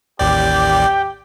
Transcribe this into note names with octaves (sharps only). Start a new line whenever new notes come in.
A1 D#2 G4 D5 G5